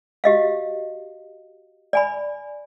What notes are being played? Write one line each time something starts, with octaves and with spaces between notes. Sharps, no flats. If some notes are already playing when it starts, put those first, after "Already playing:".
F#4 G4 D#5 F5
D5 G#5 B5